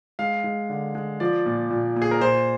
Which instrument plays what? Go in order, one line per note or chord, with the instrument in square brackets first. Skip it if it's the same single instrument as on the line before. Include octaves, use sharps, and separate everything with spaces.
[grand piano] G#3 F5
G#3
D3
G#3
F3 D5
A#2
A#2
A#2
G#4
A#4
A#2 C5